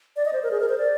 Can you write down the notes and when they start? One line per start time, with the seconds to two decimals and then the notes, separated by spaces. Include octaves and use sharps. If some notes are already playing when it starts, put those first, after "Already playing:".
0.16 D5
0.25 D#5
0.33 C5
0.43 A#4
0.51 G#4
0.60 A#4
0.69 C5
0.78 D5